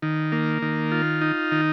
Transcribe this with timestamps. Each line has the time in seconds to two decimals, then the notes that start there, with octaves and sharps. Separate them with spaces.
0.02 D#3
0.32 A#3
0.62 D#3
0.92 F4
1.21 D#4
1.52 D#3